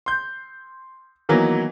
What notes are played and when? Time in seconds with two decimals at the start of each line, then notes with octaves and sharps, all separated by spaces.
0.06 C6 G6
1.29 D#3 E3 F#3 A#3 B3